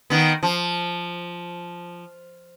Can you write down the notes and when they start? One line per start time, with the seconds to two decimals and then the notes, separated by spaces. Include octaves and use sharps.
0.10 D#3 B3
0.43 F3